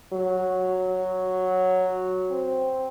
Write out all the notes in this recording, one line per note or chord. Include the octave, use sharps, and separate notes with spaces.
F#3
C4